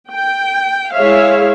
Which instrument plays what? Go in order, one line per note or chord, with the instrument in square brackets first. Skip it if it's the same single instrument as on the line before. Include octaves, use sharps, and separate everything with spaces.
[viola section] G5
G#3 E4 G#4 C#5 E5 F5